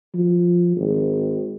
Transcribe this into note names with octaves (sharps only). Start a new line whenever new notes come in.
F3
G#1